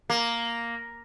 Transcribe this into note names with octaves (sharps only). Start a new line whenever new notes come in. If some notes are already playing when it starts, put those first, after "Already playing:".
A#3